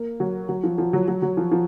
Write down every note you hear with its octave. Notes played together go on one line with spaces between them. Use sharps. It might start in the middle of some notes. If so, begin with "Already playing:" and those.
Already playing: A#3
F#3
F#3
F3
F3
F#3
F#3
F#3
F3
F3